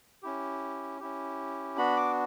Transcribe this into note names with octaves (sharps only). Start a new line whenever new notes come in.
C#4 E4 G4
C#4 E4 G4
B3 D4 F#4 B5
D6